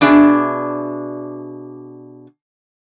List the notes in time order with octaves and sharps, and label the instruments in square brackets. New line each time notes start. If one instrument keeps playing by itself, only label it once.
[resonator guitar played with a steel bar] B2 D4 G#4 E5